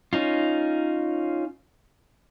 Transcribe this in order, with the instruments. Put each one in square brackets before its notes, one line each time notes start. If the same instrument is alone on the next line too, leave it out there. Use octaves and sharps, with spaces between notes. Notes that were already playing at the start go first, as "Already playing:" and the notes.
[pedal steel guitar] C#4 D#4 F4